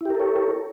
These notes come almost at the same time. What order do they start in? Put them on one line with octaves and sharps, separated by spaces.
E4 G4 A#4 A4 C#5